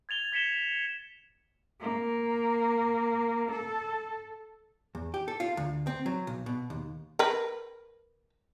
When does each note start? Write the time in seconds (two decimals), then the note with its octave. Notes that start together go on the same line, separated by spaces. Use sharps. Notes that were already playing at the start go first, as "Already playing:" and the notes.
0.09 G#6 A6 F7 G7
0.32 G#6 B6 C#7 E7 G7
1.81 A#3
3.52 A4
4.95 E2
5.14 G4
5.28 A4
5.40 F4
5.57 D2
5.87 C4
6.06 F#3
6.27 B1
6.46 B2
6.70 D#2
7.19 A#4 B4